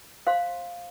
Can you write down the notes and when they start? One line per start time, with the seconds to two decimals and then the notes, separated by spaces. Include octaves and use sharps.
0.27 C5 F5 C6